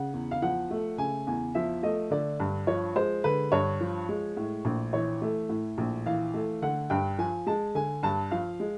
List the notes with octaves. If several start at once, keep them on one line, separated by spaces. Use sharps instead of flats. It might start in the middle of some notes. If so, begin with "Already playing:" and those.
Already playing: C#3 F#5
E2
F5
F3 F#5
A3
C#3 G#5
E2 G#5
F3 E5
A3 D#5
D3 D5
G2
F3 C#5
G#3 C5
D3 B4
G2 C#5
F3
G#3
A2
A#1
E3 C#5
A3
A2
A#1
E3 F5
A3
D3 F#5
G2 G5
F3 G#5
G#3 A5
D3 G#5
G2 A5
F3 F5
G#3